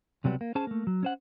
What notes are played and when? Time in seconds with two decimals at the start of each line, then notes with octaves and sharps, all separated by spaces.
0.24 C#2 C3 F#3 G3 B3
0.41 A#3
0.55 C#4 G#4 C5 A5
0.67 A3 A#3
0.87 F#3
1.03 C#4 C5 F#5